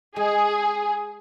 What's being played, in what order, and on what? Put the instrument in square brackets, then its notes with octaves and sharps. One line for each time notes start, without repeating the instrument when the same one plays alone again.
[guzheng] G#3 [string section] G#4